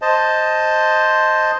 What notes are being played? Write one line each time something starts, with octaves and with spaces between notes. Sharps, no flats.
C5 D#5 A5